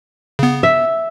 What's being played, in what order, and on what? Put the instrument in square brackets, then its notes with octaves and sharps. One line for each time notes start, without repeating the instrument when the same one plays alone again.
[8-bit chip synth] C#3 B3
[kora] E5